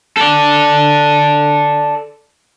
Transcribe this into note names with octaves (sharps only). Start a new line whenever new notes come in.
A4 D5